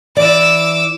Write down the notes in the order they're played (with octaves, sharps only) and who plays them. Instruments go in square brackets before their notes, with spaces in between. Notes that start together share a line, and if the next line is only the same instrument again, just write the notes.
[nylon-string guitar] E3 D5 [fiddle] D6 E6